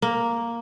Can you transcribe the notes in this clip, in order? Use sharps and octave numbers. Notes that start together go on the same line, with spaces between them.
A#3